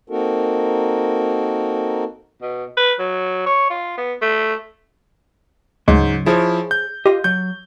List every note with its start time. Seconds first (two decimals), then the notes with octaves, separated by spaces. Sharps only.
0.10 A#3 C4 D#4 F#4 A4 A#4
2.42 B2
2.77 B4
2.99 F#3
3.46 C#5
3.70 F4
3.97 B3
4.22 A3
5.88 D2 G#2 C#3 F#3 G#3
6.26 F3 E4 G#4 C5 C#5
6.71 G6
7.06 F4 G4 D#5
7.24 F#3 G6